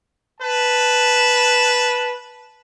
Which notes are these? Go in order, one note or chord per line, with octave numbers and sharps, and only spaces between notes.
B4 A5